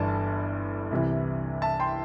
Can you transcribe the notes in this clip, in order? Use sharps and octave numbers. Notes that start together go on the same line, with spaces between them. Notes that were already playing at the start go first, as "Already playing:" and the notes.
Already playing: G1 G2 E3 D5 A5
C2 C3 E3
E5 A5
G5 C6